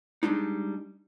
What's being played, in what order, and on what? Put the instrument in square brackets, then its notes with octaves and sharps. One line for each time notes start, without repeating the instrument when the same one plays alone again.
[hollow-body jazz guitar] G3 G#3 D4 D#4